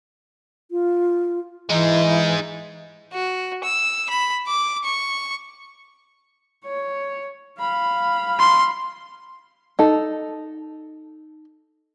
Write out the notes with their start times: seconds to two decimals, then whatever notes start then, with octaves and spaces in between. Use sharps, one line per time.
0.71 F4
1.70 E3 G#3 D#4
3.13 F#4
3.64 E6
4.09 B5
4.47 D6
4.84 C#6
6.64 C#5
7.59 F5 B5
8.39 C6
9.79 D#4 A4